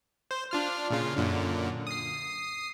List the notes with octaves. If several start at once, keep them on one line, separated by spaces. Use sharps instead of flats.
C5
D4 F4 F6
A#2 C#3 F4
F#2 A#2 D3
D#6 C7